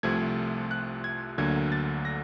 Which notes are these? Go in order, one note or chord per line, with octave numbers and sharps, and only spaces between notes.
C2 C3 F3 A3 G#6
F#6
G#6
D2 D3 F#3 A#3 G#6
A6
A#6